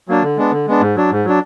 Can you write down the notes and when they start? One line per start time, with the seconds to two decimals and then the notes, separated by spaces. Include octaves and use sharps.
0.08 F#3 A#3 D4
0.23 D3
0.37 G#3 B3 D4
0.52 D3
0.67 G#3 B3 D4
0.81 G#2
0.96 F#3 D4
1.11 G#2
1.25 F#3 D4